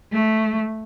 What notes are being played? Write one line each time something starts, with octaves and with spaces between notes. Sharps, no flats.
A3